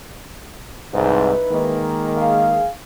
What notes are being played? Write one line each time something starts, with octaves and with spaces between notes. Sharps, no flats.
C2 G#2 D#4 E4 B4
D#3 G#3 A#3
G#4 F5